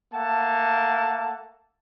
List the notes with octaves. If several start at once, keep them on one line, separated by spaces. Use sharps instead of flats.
A3 A#3 F#5 A5